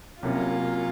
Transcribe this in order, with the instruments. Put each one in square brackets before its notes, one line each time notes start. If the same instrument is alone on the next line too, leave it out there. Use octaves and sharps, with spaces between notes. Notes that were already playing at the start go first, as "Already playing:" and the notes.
[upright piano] C2 C3 F#3 A#3 [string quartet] C#4 F4